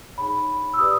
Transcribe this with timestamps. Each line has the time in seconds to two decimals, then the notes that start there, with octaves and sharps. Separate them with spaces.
0.18 D#4 G#4 C#5 B5
0.74 E6
0.79 G4 B4 D5 D#6